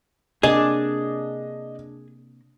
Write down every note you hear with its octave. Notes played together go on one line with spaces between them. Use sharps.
C3 A#3 D4 G#4 D#5